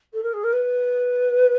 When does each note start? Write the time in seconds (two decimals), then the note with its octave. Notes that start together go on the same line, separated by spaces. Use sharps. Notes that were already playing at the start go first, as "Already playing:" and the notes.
0.13 A4
0.23 A#4
0.33 G#4
0.43 A#4
0.52 B4